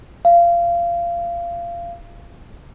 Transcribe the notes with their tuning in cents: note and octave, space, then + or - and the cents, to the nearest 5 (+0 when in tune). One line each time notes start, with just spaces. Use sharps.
F5 -25